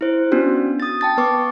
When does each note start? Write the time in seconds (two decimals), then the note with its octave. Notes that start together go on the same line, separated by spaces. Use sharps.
0.01 E4 C5
0.32 B3 C#4 D4 F#4
0.80 D#6 A6
1.01 G5 A5 A6
1.17 B3 B4 C#6 D6